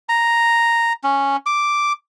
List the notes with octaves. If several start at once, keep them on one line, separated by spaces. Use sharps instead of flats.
A#5
C#4
D6